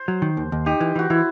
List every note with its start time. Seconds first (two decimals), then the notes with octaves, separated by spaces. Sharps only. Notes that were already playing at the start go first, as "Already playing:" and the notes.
Already playing: C5
0.08 F#3
0.22 D#3
0.37 D#2
0.52 D#2
0.66 D#4 G4
0.80 E3
0.96 E3 F#4
1.10 E3 E4